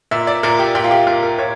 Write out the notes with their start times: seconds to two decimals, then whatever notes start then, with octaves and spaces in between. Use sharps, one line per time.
0.11 A#2 E5
0.27 D5
0.43 A#2 A#4
0.59 G4
0.75 A#2 G4
0.84 F4
0.91 G4
1.07 A#2 A#4
1.23 A#4
1.38 A#2 C#5